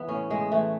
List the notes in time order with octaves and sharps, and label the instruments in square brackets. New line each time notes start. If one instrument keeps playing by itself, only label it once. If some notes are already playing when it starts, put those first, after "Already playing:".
Already playing: [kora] E3 B3
A2 C#4
A2 G#3
E3 A3